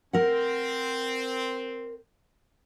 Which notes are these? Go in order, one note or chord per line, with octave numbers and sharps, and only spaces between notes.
C4 A#4 F#5